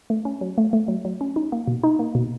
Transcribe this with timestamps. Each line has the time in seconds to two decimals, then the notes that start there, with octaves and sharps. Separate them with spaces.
0.10 A3
0.25 C#4
0.41 F#3
0.58 A3
0.73 A3
0.88 F#3
1.05 F#3
1.21 C#4
1.36 D#4
1.52 A#3
1.67 B2
1.83 D#4
1.99 A#3
2.15 B2